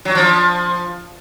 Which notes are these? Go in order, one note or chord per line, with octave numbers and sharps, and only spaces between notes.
F#3
F3